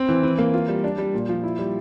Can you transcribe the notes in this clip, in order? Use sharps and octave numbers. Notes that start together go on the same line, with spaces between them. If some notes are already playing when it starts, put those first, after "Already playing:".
Already playing: C4
E3
E3
A#3
F4
G3
D4
G3
A#2
F3
E4
G3